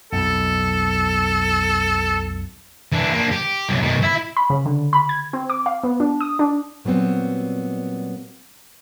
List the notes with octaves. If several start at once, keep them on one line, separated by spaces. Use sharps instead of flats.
B1 F2 A4
E3 D4
A#3 D4
G4
C2 F#3
B2 D#3
E4
B5
C#3
D3
B5
G#6
C4
D6
F5
B3
D4
D#6
D4
A#2 F#3 G3 B3 C4